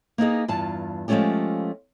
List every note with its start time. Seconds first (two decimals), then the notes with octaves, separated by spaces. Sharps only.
0.18 A#3 B3 D#4 G#4
0.48 E2 G2 F4 A5
1.08 F3 G#3 A3 C#4 F4 G4